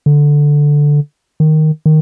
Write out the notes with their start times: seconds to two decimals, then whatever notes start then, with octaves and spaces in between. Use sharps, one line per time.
0.06 D3
1.40 D#3
1.86 D#3